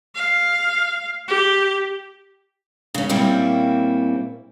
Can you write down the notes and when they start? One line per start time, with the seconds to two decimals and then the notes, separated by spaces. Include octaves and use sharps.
0.15 F5
1.28 G4
2.94 C#3 C#4
3.09 A#2 G3 A#3 C4 C#4 E4